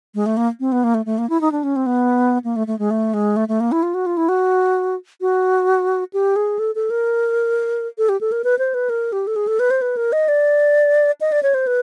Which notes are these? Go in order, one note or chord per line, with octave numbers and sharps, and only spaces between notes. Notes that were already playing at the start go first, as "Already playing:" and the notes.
G#3
A3
A#3
C4
B3
A#3
A3
A3
A#3
E4
D#4
D4
C#4
C4
B3
A#3
A3
A3
G#3
A3
G#3
A3
A3
A#3
E4
F4
F#4
F4
E4
F#4
F#4
G4
G#4
A4
A4
A#4
A4
G4
A4
A#4
B4
C5
B4
A#4
G4
A4
G#4
A4
B4
C5
B4
A#4
D#5
D5
D#5
D5
C#5
C5
B4